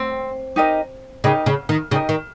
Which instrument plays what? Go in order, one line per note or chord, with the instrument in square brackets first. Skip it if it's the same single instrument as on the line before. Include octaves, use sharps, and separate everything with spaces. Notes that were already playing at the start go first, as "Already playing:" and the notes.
Already playing: [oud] C4
[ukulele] D#4 G4 A#4 D#5
[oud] C#3 [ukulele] D#4 G4 A#4 D#5
[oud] C#3
D#3
[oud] C#3 [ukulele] D#4 G4 A#4 D#5
[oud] D#3